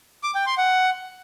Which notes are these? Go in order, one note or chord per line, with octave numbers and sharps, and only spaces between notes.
D6
G5
C6
F#5